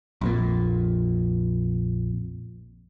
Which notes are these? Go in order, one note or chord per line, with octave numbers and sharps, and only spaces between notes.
A#1 F2 A#2